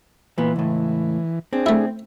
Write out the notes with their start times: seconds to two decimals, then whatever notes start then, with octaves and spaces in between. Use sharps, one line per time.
0.38 A#2 E3 B3
0.56 C#2 A2
1.53 C4 D4 G#4
1.66 A3 E4